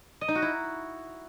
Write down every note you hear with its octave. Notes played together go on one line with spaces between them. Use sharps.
D#5
D#4
F#4
E4